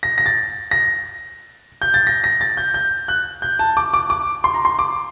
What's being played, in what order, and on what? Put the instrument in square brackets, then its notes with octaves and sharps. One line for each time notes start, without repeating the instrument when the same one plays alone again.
[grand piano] A#6
A#6
A6
A#6
G6
A6
A#6
A#6
A6
G6
G6
F#6
G6
A5
D6
D6
D6
C6
A#5
C6
D6